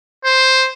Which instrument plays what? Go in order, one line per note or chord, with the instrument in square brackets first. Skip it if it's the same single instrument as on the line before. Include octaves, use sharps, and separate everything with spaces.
[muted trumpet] C5